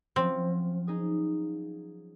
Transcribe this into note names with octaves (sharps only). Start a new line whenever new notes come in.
F3 F#3 C4 C#4
D#4 G#4 D#6